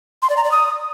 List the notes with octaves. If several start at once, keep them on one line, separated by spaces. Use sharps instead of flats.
C6
D5
A#5
D5
D#6